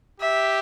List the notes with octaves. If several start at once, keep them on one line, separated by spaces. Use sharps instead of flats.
G4 E5